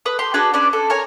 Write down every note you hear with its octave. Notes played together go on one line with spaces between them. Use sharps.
B4 D#6
G4 C6
D4 F#4 G#4 B4
C#4 D4 B4 D5
A4
A#4 C#5 G#5